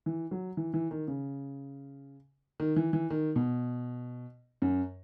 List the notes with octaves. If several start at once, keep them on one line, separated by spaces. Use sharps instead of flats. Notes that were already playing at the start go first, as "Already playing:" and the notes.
E3
F#3
E3
E3
D#3
C#3
D#3
E3
E3
D#3
B2
F#2